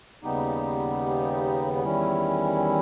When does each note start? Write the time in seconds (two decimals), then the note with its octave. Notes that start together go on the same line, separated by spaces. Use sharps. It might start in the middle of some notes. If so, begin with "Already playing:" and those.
0.23 D#2 C#3 G3 B3 D#4 G4
1.84 E2 D#3 G3 C#4 E4